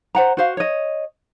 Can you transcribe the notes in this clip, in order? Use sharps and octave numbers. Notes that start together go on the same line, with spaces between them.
C5 F#5 A#5
F#4 C5 F5
C#5 D#5